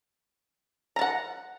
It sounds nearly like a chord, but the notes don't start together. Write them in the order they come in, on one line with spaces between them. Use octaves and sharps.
A#5 A5 F#5